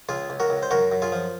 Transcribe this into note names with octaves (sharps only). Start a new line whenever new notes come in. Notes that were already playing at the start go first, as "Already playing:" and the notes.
C#2 F4 G#4
C#2
F#4 A#4
C#2
C5
F#2 F#4 A#4
F#2
F4 G#4
F3